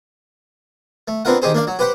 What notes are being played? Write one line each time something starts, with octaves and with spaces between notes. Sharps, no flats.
A3
B3 C4 D4 F4 A#4 F#5
D#3 D#4 G4 G#4 C5
A#3 D4 D5 F5
F#3
G4 B4 C5 F#5 G5